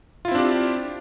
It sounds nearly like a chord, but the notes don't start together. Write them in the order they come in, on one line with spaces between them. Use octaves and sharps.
F4 E4 C4 D4 G4